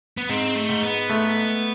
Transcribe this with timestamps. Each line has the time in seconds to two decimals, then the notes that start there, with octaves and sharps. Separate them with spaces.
0.17 B3
0.29 G#2 C4
0.55 A3
0.69 G#2
0.82 B3
1.10 A3